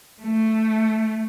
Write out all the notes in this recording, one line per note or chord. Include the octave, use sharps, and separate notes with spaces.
A3